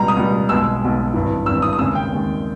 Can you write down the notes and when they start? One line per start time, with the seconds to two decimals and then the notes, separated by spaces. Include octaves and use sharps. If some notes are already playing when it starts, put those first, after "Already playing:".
Already playing: C#2 B2 G3 A#5
0.08 D#6
0.16 C#2 B2 G3
0.49 B1 B2 G#3 E6
0.82 B1 B2 G#3
1.14 G#1 G2 E3
1.46 G#1 G2 E3 E6
1.62 D#6
1.73 D#6
1.78 D#2 C#3 G#3 E6
1.95 G5
2.11 D#2 C#3 G#3